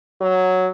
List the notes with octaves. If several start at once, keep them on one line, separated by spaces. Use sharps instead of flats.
F#3